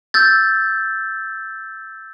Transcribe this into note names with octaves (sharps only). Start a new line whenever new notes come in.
E6 G6 A6